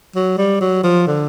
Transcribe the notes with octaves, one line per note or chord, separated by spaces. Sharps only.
F#3
G3
F#3
F3
D3